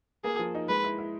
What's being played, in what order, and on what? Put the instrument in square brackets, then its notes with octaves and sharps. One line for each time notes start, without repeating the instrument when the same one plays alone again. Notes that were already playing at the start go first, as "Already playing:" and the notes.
[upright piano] A#3 [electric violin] G#4
[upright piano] F3
D#4
[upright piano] G#3 [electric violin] B4
[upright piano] E4
E4